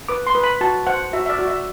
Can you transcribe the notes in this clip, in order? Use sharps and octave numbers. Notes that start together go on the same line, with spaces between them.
B4 D6
C6
B4
B5
F#4 A5
C5 F#5
F#4 E5
E5
D5
F#4
E5